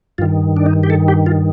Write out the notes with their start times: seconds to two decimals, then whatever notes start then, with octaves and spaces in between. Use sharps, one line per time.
0.18 G2 D#3 F4
0.56 D4
0.66 D#4
0.83 G4
0.90 A4
1.08 G4
1.26 F4